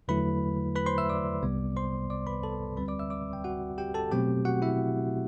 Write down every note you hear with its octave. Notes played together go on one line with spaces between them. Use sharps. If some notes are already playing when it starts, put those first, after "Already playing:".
E2 D3 F#3 A3 E4 B4 B5
B4 B5
C5 C6
E5 E6
D5 D6
C2 C3 G3 B3
C5 C6
D5 D6
B4 B5
A4 A5
D2 D3 G3 C4 B4 B5
D5 D6
E5 E6
D5 D6
G5
F#4 F#5
G4 G5
A4 A5
B2 F#3 A3 C4 G4 G5
F#4 F#5
E4 E5